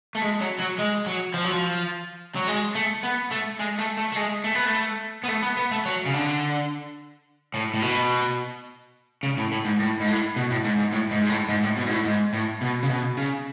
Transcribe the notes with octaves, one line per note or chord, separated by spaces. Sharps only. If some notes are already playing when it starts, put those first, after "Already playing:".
A3
G#3
F#3
F#3
G#3
F#3
F3
F#3
F3
F#3
G#3
A3
B3
A3
G#3
A3
A3
A3
G#3
A3
B3
A3
B3
A3
B3
B3
A3
F#3
C#3
D3
A2
A2
B2
C#3
A2
A2
G#2
A2
G#2
A2
B2
A2
G#2
G#2
A2
G#2
G#2
A2
G#2
A2
B2
G#2
A2
G#2
A2
B2
C#3
B2
C#3